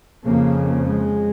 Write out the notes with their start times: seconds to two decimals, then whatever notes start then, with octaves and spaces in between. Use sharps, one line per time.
0.27 F2 C#3 A#3
0.85 G#3